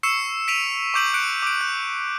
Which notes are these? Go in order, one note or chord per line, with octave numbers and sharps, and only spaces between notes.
C#6 E6 C7 C#7 E7
B6 D7 D#7 F7
C#6 D6 G6 D7 F#7
F#6 C#7 D7
D6 D7
F#6